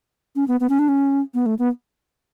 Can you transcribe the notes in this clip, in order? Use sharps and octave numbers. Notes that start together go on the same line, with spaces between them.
C#4
B3
B3
C#4
D4
C#4
B3
A3
B3